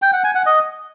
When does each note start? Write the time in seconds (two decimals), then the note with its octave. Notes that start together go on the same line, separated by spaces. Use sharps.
0.02 G5
0.13 F#5
0.24 G#5
0.35 F#5
0.46 D#5